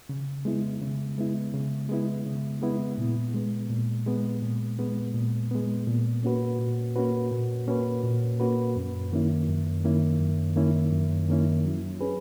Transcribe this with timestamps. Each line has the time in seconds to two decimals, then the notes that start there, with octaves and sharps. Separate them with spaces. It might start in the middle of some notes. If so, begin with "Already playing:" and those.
0.09 C#3
0.45 G#3 B3 E4
0.82 C#3
1.18 G#3 B3 E4
1.54 C#3
1.89 G#3 B3 E4
2.26 C#3
2.62 G#3 B3 E4
2.98 A#2
3.34 G#3 B3
3.70 A#2
4.06 G#3 B3
4.42 A#2
4.79 G#3 B3
5.15 A#2
5.51 G#3 B3
5.87 A#2
6.23 A#3 C#4 F#4 B4
6.59 A#2
6.96 A#3 C#4 F#4 B4
7.31 A#2
7.68 A#3 C#4 F#4 B4
8.03 A#2
8.40 A#3 C#4 F#4 B4
8.76 F#2
9.12 D#3 A#3 C#4 E4
9.48 F#2
9.84 D#3 A#3 C#4 E4
10.20 F#2
10.56 D#3 A#3 C#4 E4
10.93 F#2
11.28 D#3 A#3 C#4 E4
11.65 F#3
12.01 C#4 G#4 B4